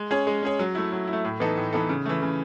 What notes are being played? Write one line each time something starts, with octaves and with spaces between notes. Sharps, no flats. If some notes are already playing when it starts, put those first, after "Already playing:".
Already playing: G#3
C#4 G#4 C#5
G#3
C#4 G#4 C#5
F#3
A3 E4
F#3
E4
A3
A2
E3 B3 D#4 A4
A2
E3 B3 D#4 A4
C#3
E3 A3
C#3